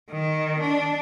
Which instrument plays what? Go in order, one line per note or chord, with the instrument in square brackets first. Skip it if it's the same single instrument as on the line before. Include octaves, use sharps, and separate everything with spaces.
[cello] D#3
D4